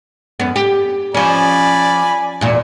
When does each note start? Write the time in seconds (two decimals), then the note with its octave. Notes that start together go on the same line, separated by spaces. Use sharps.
0.40 F#2 B3
0.56 G4
1.15 F3 C#4 D5 G#5 B5
2.41 E2 A#2